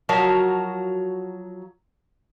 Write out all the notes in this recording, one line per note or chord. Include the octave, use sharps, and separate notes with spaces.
F3 F#3 F#4 A#4 C#5